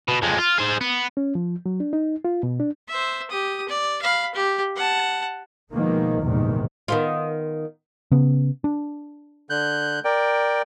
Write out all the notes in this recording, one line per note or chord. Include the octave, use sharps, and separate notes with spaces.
B2
F2 G#3
F4
G#4 C5
B3
C#4
F3
F#3
D4
D#4
F4
B2
D4
C5 E5
G4 D#6
D5
F5 B5
G4
F#5 A5
B2 D#3 F3 G#3 A#3
A#1 E2 G#2 C3 D#3
D#3 B3 F4
C#3 B3
D4
D3 F#6 G6
A#4 D5 G5